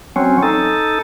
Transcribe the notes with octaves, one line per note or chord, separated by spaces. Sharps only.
F#3 C4 C#4
D#4 A4